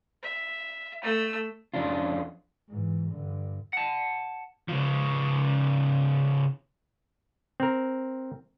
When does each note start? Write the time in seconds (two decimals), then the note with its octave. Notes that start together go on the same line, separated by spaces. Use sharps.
0.23 E5
1.03 A3 E6
1.74 F2 F3 C#4 D4 F4
2.69 G#2 E3
3.10 G2 D3
3.73 F#5 A5
4.68 C#3 F3
7.60 C4 A#4